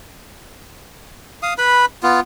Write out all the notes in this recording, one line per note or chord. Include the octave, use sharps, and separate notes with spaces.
F5 D#6
B4 B5
B3 F4